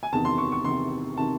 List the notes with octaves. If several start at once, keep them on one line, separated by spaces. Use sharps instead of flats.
G#5
E2 C3 D#3 A5
C6
C#6
C#6
E2 C3 D#3 C6
C3 D#3 A5